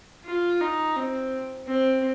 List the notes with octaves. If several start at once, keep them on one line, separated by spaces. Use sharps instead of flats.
F4
D#4
C4
C4